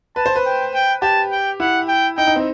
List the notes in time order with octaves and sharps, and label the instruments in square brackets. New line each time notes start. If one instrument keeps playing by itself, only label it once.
[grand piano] B4 [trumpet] A5
[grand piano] C5
B4
[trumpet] G5
G5
[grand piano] G4 [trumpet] A5
[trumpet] G5
[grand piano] E4 [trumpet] F#5
[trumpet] G5
[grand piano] D#4 [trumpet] G5
[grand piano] D#4
C4